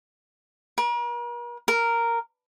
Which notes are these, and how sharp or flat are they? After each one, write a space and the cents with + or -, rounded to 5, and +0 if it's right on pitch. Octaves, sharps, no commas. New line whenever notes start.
A#4 +45
A#4 -5